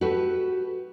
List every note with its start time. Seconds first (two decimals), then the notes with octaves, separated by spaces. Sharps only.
0.01 F#4 G4 A4 B4